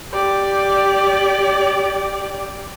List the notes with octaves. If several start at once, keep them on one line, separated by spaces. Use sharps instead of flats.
G4 D5